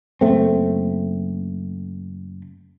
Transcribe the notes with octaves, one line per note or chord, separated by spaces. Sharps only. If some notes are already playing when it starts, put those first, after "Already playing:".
F#1 A3 C4